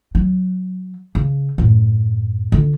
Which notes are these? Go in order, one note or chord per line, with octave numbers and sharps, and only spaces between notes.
F#3
C#3
F#2 A2
D3 F4